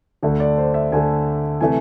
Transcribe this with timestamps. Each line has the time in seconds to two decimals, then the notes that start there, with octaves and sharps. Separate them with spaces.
0.23 D2 D3 A3
0.40 D5
0.58 C5
0.74 E5
0.91 D2 D3 A3 G#5
1.61 C3 E3 A3 G#5